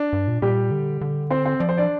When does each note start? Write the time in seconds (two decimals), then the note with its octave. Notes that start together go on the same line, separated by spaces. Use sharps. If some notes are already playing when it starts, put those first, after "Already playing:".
Already playing: D4
0.13 G2
0.27 A#2
0.42 A#2 G3 G4
0.71 D3
1.01 D3
1.30 C4 C5
1.45 C4 C5
1.60 F3 D5
1.69 C5
1.77 D4 D5